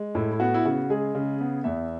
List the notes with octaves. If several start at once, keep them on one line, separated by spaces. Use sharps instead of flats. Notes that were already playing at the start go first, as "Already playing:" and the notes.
Already playing: G#3
A2 E4
E4
B3 F#4
E4
C#3 F#4
G#3 G#4
C#3
B3
E2 E5